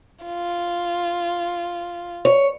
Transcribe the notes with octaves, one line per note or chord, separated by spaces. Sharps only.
F4
C#5